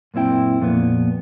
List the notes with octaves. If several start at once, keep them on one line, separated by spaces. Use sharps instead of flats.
F#2 A#2 C4 E4 G5
F2 A#2 B3